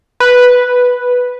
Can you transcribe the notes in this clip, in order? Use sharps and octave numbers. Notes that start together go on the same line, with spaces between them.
B4